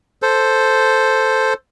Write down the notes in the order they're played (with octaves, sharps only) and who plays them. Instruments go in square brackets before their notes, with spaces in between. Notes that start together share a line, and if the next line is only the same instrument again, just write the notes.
[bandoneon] A4 C5